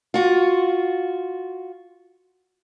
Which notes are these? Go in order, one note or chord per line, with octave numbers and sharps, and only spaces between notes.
F4 F#4